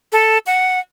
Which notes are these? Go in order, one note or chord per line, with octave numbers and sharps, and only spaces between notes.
A4
F#5